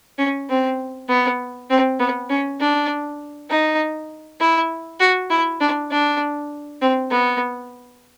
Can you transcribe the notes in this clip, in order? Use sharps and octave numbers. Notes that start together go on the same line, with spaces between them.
C#4
C4
B3
C4
B3
C#4
D4
D#4
E4
F#4
E4
D4
D4
C4
B3